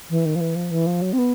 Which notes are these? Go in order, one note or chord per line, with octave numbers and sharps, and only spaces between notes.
E3
D#3
F3
E3
F3
E3
F3
F#3
C4
B3